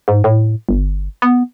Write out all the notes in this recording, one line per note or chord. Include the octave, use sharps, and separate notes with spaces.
G#2
A2
G1
B3